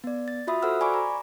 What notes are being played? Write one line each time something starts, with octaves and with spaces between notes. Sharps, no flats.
B3 D5
A6
F4 F#4 E5 B5 D#6
F#4 A4 C5 F#5 E6 F6
D5 G#5 B5 C#6 D6
A#5